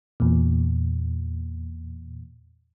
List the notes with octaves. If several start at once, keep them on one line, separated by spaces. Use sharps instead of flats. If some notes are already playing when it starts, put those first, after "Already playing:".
E2 A#2